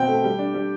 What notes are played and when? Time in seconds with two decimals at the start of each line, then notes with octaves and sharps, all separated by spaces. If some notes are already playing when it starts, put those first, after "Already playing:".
Already playing: B2 C4 G5
0.08 A3
0.24 G3
0.39 D4
0.54 G3